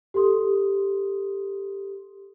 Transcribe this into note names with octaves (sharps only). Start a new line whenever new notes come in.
G4 A4 C6 D#6